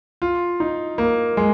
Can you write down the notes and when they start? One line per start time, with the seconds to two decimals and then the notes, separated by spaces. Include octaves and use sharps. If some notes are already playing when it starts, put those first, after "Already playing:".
0.22 F4
0.60 D#4
0.98 A#3
1.37 G#3